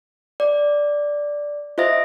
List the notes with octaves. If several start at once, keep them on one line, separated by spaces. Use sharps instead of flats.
D5
F4 C5 D#5 E5 A#6